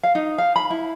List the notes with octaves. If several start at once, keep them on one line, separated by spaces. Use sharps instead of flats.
F5
D#4
F5
B5
E4